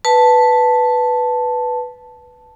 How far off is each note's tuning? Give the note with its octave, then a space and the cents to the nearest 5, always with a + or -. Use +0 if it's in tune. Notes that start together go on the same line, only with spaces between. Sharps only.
B4 +0 A5 +0